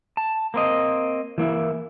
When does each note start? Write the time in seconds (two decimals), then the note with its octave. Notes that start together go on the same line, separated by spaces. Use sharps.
0.17 A5
0.54 A#3 C4 D#5
1.38 E3 A#3 E4